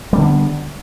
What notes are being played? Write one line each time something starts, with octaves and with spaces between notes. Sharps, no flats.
D3 G3 B3 C#4